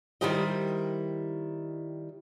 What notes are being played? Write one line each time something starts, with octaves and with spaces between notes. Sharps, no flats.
D#3 G3 E4 G4 C5 D#5